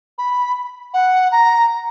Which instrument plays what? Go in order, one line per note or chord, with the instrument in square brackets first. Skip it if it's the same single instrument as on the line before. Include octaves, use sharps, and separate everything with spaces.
[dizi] B5
F#5
A#5